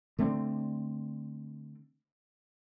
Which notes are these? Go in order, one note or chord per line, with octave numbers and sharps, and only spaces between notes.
D3 A3 C4 D4